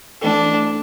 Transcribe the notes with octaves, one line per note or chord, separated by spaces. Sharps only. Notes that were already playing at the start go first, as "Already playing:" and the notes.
E3 A3 D4 E4 A4